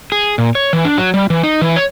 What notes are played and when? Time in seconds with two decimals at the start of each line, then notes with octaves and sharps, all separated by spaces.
0.12 G#4
0.38 A#2
0.55 C#5
0.73 E3
0.85 D4
0.98 F#3
1.14 G3
1.30 E3
1.43 D#4
1.61 E3
1.76 C#5